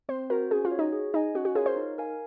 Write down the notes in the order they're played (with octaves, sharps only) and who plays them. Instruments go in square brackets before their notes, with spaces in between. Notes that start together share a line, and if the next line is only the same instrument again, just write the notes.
[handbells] C4 [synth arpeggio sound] C5
[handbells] F#4 C5 [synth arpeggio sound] A#4
[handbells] C#4 [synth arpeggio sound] G#4
[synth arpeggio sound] F4
[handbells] F#4 C#5
[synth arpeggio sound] D#4
[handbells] G#4
[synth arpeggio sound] D#4 [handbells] D#5 G#5
[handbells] C#4 [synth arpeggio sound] F#4
[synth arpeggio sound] F#4
[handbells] F4 A#4 C#5 F5 [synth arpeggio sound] G#4
[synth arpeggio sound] C5
[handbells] D#4
A#4 F5 G#5